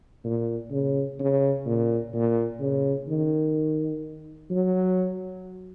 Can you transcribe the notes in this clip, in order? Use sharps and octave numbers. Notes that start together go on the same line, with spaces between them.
A#2
C#3
C#3
A#2
A#2
C#3
D#3
F#3